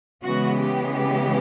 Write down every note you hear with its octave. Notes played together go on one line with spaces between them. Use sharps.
C#3 E3 G#3 B3 F#4
G4
G4